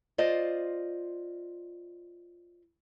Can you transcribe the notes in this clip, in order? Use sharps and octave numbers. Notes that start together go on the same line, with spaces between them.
F4 C5 D5 D#5